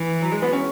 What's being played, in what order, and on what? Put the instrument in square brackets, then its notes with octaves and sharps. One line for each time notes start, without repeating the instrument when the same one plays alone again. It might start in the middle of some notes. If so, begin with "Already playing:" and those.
Already playing: [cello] E3
[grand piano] F#3
G#3
B3
C#4